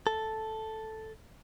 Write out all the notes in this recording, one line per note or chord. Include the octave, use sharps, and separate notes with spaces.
A4